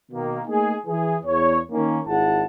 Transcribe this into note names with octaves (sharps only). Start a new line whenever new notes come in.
B2 D#3 A#3
A3 A#3 D#4 G#4
E3 G#4
E2 C#5
D#3 A#3 C#4
G#1 E4 G#4 F#5 A5